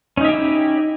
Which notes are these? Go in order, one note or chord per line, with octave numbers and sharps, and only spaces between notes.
C#4 D#4 E4 G4 E5